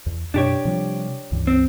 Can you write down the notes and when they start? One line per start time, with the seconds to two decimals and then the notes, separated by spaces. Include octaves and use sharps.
0.06 E2
0.34 F#2 B2 D4 G4 C#5
0.65 C3 F3 G3
1.32 C#2 G2 E3
1.47 C4